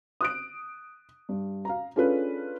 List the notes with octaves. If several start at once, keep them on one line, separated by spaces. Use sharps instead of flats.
D#6 F#6 D7
G2
F5 A#5
C#4 D4 F4 G#4 A4 B4